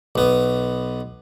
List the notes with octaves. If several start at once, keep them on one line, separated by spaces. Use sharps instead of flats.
B1 B3